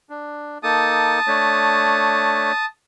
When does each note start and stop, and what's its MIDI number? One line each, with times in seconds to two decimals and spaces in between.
0.10 0.58 62
0.63 1.20 58
0.63 1.20 63
0.63 1.20 69
0.63 2.65 81
0.63 2.65 87
1.27 2.52 57
1.27 2.52 62
1.27 2.52 73